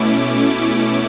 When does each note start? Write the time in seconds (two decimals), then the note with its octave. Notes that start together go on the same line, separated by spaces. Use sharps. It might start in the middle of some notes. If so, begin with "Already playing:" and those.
Already playing: B2 A3 C#4 E4 D6
0.19 D6
0.53 D6